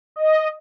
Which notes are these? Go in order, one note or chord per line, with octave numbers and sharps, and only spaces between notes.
D#5